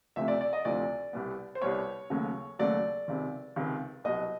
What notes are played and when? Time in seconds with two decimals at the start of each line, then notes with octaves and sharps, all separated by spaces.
0.16 D2 C3 F3 A3 E5
0.28 D5
0.41 D5
0.53 D#5
0.65 D2 C3 F3 A3 D5
1.13 C2 B2 G3 B3
1.55 C5
1.62 C2 B2 G3 B3 C#5
2.10 D#2 C#3 F#3 A3
2.59 D#2 C#3 F#3 A3 D5
3.08 C#2 C3 D#3
3.56 C#2 C3 D#3
4.04 C2 B2 F#3 D#5